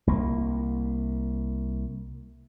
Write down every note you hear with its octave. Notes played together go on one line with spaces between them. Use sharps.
C2 A#3